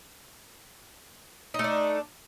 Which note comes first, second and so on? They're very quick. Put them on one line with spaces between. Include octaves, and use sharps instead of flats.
D#4 A3 D4